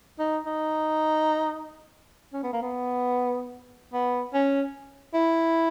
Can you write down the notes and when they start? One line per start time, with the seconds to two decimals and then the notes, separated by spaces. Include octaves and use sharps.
0.19 D#4
0.46 D#4
2.34 C#4
2.43 B3
2.53 A#3
2.63 B3
3.93 B3
4.34 C#4
5.14 E4